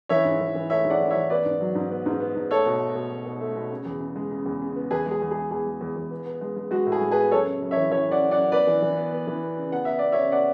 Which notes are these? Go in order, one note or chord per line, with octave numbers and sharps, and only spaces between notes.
E3 C#5 E5
G#2
E3
E3
A3 C#5 E5
G#2
D5 F#5
E3
C#5 E5
E3
B3 B4 D5
G#2
F#3
G#2
B3
G#2
B3
G#2
A3 A4 C#5
B2
A3
B2
B2
B2
A3
B2
C#3
E2
C#3
G#3
C#3
E2
C#3
B3
E2 G#4 B4
G#3 G#4
E2
G#4
G#3
E2 G#4
G#3
E2
E2
B3
B3
G#3
G#3
G#3 F#4
A2
G#4
G#3
G#4 B4
B3
F#2 A4 C#5
C#3
F#2
C#5 E5
E3
E3 C#5 E5
F#2 D5 F#5
F#2
D5 F#5
F#2
B3 B4 D5
E3
E3
B3
B3
E3
B3
C#3
B3 F#5
B3 E5
B3 D5
C#5 E5
C#3
B3 D5 F#5